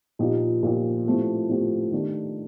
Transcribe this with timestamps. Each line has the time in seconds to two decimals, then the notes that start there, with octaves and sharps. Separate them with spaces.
0.19 A#2 F3 A#3 D#4 G4
0.63 A#2 F3 A#3 D#4 G4
1.06 A2 F3 A3 C4 G4
1.49 A2 F3 A3 C4 G4
1.92 D#3 A3 D4 G4